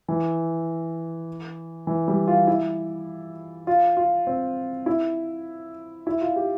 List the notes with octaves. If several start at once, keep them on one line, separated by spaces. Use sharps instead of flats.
E3
E3
G3
F4
E4
F4
F4
C4
E4
E4
F4
G4